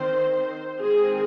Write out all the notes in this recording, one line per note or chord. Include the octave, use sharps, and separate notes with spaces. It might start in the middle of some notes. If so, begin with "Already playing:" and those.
Already playing: D#3 C4 C5
D#3 G#3 C4 G#4